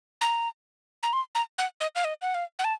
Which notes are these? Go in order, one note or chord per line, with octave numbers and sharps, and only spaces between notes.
A#5
A#5
C6
A#5
F#5
D#5
F5
D#5
F#5
F5
F#5
A5